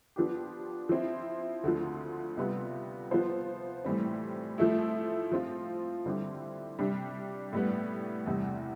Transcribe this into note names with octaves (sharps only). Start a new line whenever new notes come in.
F3 B3 D4 G4
F3 C4 E4
D2 D3 F3
C3 G3 B3 F4
F3 B3 F4 C5
A2 E3 G3 C4
F3 A3 E4
F3 C4 F4
D3 G3 C4 E4 G4
C3 G3 D4 G4
A2 G3 B3
E2 C3 G3